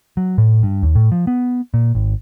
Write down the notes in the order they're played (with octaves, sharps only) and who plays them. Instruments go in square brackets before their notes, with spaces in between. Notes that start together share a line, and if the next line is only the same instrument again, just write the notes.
[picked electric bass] F#3
A2
G2
D#2
A2
F3
B3
A#2
G#1